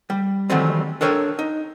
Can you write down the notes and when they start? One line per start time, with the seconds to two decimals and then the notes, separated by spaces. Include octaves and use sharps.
0.10 G3
0.50 D#3 E3 F#3 G3 A3 C4
1.01 D4 A4 A#4 C#5 G5
1.39 D#4